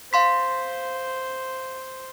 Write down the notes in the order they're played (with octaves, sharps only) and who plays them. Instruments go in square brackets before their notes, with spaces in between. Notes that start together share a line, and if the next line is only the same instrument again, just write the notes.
[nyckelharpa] C5 [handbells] F5 C6 B6